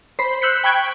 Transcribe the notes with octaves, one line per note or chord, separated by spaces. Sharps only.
C5 B5
E6 F#6 G6 B6 C#7
G5 B5 C#6 F#6 G#6 D7